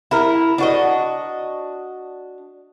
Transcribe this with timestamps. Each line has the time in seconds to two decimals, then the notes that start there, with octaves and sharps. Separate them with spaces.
0.11 E4 A#4
0.58 D4 F#4 D#5